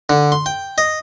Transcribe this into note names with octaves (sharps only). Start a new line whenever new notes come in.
D3
C6
G5
D#5